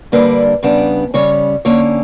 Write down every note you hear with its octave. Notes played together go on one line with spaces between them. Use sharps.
D3 G3 A#3 D4 B4
C#3 G3 B3 D4
C#3 G3 C#4 C#5
D3 A#3 C#4 C#5